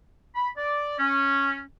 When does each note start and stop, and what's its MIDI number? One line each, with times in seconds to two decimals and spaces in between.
0.35 0.49 83
0.57 0.94 74
0.98 1.60 61